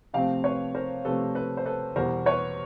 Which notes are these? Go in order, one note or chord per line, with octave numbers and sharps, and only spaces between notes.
C3 F3 A3 C4 F5 G5
B4 C#5
A#4 C5
C3 F3 A3 C4 A4 B4
A4 B4
C5
A4 B4
E2 B2 G3 A#4 C5
B4 C#5